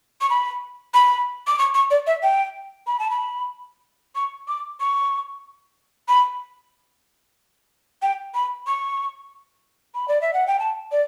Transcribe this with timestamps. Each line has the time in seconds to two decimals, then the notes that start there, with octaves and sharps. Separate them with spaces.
0.21 C#6
0.30 B5
0.94 B5
1.47 D6
1.59 C#6
1.74 C#6
1.91 D5
2.07 E5
2.23 G5
2.87 B5
2.99 A5
3.11 B5
4.15 C#6
4.48 D6
4.80 C#6
6.08 B5
8.02 G5
8.34 B5
8.67 C#6
9.95 B5
10.08 D5
10.21 E5
10.33 F#5
10.47 G5
10.59 A5
10.92 D5